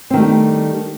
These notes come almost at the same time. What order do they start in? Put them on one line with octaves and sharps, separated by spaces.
C4 D#3 A3 G3 D4